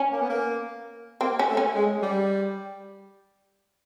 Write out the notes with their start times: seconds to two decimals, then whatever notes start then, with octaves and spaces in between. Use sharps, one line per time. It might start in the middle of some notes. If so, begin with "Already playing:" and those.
Already playing: C#4
0.12 A#3
0.21 B3
0.29 A#3
1.21 A#3 C4
1.39 C#4
1.48 A3
1.57 C#4
1.76 G#3
2.02 G3